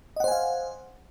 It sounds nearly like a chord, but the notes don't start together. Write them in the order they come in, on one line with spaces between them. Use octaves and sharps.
D#5 F#5 C5 G#5 F5